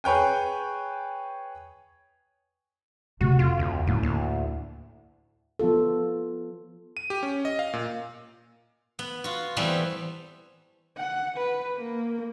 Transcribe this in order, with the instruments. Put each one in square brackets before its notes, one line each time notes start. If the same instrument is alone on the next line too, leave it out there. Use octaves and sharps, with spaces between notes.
[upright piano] G#4 B4 C#5 G5 G#5
[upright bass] C3 A3 [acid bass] F#4
[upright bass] F2 [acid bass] F4
[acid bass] D2
[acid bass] F#2 [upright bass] A2 A#3
[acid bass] D2
[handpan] F3 B3 F4 A4
[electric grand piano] D#7
G4
C#4
D#5
F5
A#2
[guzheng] B3
F4 F#4
E3 G3 A3 B3 C4
[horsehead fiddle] F#5
B4
A#3